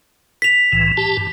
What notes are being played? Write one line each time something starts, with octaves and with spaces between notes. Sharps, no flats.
B6 F7
C2 A2 E3
G4 A5
G2